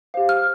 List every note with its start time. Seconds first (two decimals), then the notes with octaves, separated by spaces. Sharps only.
0.14 G4 C5 F5
0.29 F6